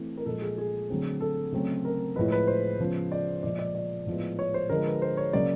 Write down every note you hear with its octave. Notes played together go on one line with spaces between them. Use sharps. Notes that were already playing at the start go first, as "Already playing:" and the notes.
Already playing: E3 A3 C4
A#4
A#2 F3 G#3 A4
G#4
G#4
D3 F#3 A3 C4
A4
C#3 F#3 A3 C4
A#4
A2 F3 G#3 B4
B4
C5
C#3 F3 G#3 B3
D5
A#2 F3 G#3 D5
D5
D5
A2 F3 G#3 B3
C#5
C5
D3 F3 G#3 A#4
B4
C5
C#5
C#3 F#3 A#3 D5